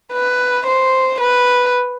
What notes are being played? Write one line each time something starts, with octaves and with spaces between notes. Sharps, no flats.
B4
C5
B4